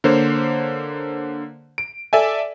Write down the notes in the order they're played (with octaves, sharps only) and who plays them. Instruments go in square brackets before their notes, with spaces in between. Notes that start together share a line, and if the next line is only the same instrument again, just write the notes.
[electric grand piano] D3 A#3 C5 C#5
D7
A4 D5 E5 G#5